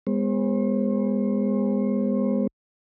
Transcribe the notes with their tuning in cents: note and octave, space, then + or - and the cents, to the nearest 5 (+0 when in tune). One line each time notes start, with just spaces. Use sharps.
G#3 -30 B3 +0 C5 +45